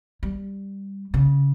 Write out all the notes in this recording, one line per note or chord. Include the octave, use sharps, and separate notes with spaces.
G3
C#3